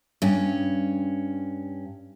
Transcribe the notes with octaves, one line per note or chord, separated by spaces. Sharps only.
G2 C#4